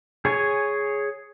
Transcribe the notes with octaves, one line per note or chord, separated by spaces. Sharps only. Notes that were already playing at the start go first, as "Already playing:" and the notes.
G#4 C#5 G#5